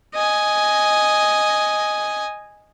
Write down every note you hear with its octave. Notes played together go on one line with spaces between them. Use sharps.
D#5 G#5